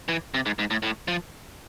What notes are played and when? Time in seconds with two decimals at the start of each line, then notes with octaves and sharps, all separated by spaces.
0.08 E3
0.34 C3
0.46 G#2
0.59 G#2
0.70 A2
0.83 A2
1.08 F3